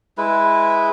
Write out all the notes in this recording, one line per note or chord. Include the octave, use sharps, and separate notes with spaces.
G#3 E4 B4